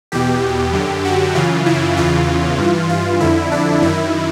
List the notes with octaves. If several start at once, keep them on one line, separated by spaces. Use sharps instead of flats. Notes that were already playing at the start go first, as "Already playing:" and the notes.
E2 B2 G4
F#2 D3
F#4
F#2 C#3 E3 F4
E4
E2 C#3 E3 F4
G2 E3
F4
F2 D3 E4
D4
F#2 D#3 E4